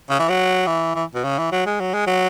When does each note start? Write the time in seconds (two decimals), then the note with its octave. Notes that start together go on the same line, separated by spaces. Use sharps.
0.10 C#3
0.19 E3
0.29 F#3
0.67 E3
0.96 E3
1.15 B2
1.24 C#3
1.39 E3
1.52 F#3
1.66 G#3
1.81 F#3
1.94 G#3
2.07 F#3